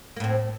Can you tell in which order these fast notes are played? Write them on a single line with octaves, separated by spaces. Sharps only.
A#3 A2 C4